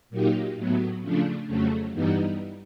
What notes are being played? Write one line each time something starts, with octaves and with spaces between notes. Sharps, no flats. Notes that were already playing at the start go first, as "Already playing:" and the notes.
A#2 F#3 A#3 D#4 G4
A2 F#3 B3
C#3 F3 A3 D4
F2 C#3 F#3 A3
G2 E3 G3 B3 D#4